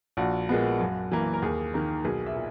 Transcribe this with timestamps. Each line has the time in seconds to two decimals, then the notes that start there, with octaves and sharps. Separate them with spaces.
0.17 A#1 F#4
0.49 A#2 G#3 B3
0.80 F#2
1.12 E3 A#3
1.34 A#4
1.42 D#2 G#4
1.74 D#3 A#3
2.04 B1 G#4
2.26 E5
2.35 A#2